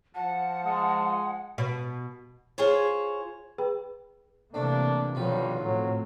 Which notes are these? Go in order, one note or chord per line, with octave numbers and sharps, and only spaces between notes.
F3 F#5 A5
G#3
B2
F4 G#4 C5 C#5
G#4 B4 G5 B5
C3 E3 A3 A#3 C4 D4
B1 G2 B2 D#3 F3 F#3 F4 B4
A2 F#3 C4